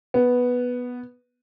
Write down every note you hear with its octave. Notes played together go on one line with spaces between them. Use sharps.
B3